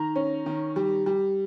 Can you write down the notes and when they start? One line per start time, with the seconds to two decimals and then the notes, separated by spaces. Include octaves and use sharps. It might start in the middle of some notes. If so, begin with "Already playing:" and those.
Already playing: D#3 A#5
0.16 C#4
0.46 D#3
0.76 G3
1.06 G3